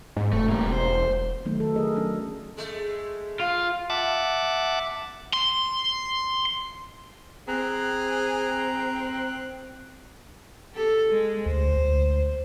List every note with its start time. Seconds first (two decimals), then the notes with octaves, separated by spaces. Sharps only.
0.16 G#2
0.33 E1 A3
0.49 G3 A#3
0.73 C5
1.45 D#3 F#3 A3 B3 D#4
1.59 D#3 A4
1.76 D#4 G#4 A#4 D#5
1.95 F#3 C#4 D4
2.57 G#3 A3
3.40 F4
3.90 E5 F#5 A5 D6
5.33 C6
7.48 C4 G#4 A#5 F#6
10.73 G4 A4
11.09 G#3
11.46 D2 C5
11.77 D2